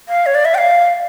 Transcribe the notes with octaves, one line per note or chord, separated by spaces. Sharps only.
F5
C#5
D5
E5
G5
F5